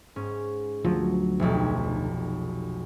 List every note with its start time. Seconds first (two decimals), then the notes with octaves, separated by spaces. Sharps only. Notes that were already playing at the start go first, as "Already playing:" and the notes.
0.16 G#2 C#4
0.85 D2 F3 F#3
1.39 F1 B1